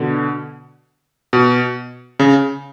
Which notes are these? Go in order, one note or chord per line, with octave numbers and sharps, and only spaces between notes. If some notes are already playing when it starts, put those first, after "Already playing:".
Already playing: B2 D3
B2
C#3